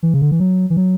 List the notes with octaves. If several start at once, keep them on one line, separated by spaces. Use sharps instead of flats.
E3
C#3
D3
E3
F#3
E3
F#3